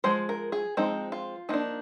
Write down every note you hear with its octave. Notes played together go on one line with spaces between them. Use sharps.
F3 G#3 C5
A#4
G#4
F3 G#3 C4 D#4
F4
F3 A#3 D4 D#4